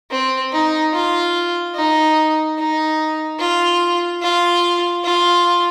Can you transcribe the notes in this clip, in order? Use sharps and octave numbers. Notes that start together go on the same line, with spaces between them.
C4
D#4
F4
D#4
D#4
F4
F4
F4